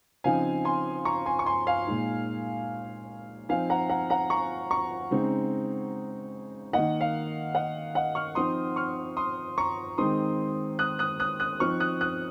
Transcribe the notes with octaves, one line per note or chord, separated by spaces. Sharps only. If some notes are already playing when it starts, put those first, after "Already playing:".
C#3 F3 C4 D#4 F5 G#5
G#5 C6
A#5 C#6
G#5 C6
C#6
G#5 C6
F5 G#5
A#2 G#3 D#4
F3 C4 D#4 F5 G#5
F#5 A#5
F#5 A#5
F#5 A#5
A#5 C#6
A#5 C#6
C#3 G#3 C4 D#4
D#3 A#3 D#4 D#5 F#5
F5
D#5 F#5
D#5 F#5
C#6 F6
F3 C4 D#4 C6 D#6
C#6 F6
C6 D#6
A#5 C#6
D#3 G#3 C4 D#4 C6 D#6
D#6 F#6
D#6 F#6
D#6 F#6
D#6 F#6
F3 C4 D#4 C#6 F6
D#6 F#6
D#6 F#6